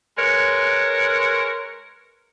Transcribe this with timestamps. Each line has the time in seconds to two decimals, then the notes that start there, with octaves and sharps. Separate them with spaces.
0.18 G#3 A#4 B4 C#5